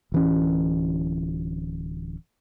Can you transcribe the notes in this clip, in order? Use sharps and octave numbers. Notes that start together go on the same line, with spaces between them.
D1 E3 C#4